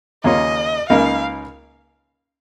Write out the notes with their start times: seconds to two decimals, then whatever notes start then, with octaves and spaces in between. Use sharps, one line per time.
0.24 D#2 C#3 A#3 C#4 F4 D#5
0.89 C#2 C#3 A#3 D#4 A#4 F5